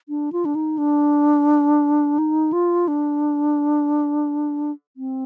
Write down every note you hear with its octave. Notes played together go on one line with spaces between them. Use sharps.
D4
F4
D4
D#4
D4
D#4
F4
D4
C4